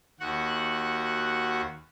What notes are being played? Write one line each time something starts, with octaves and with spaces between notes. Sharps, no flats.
D#2 F#4 F#5